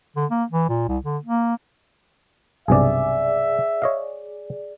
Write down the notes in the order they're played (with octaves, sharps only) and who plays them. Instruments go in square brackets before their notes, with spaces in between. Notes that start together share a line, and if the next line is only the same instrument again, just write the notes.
[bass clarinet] D3
A#3
E3
A#2
C2
D3
A#3
[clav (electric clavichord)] B1 G2 C3 [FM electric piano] G#4 D5 [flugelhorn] E5
[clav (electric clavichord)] C#5 D#5 F5